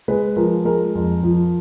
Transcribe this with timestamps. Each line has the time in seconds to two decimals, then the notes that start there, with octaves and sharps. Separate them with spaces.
0.08 G#3 B4
0.36 F3 A#4
0.65 G#3 A#4
0.95 F2
1.23 F3